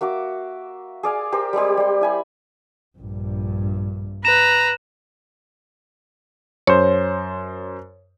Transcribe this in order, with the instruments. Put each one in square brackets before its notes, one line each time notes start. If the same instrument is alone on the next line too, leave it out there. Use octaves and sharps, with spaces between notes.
[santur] A#3 F#4 E5 D6
G#4 D5 F5 G#5
G4 A#4 C5
G3 G#3 C4 G4
G3 C6
E4 G#5 B5
[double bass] A#1 G2
[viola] B4 [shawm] A#5 [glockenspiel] E7
[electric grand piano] F#2 C5 [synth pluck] C#5